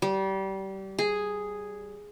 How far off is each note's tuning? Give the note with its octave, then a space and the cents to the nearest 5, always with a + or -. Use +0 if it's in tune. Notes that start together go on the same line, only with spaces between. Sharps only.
G3 -25
G#4 +0